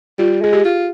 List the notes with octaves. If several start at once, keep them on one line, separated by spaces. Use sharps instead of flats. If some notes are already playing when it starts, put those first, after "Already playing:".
G3 F4
G#3 G#4
G4
F4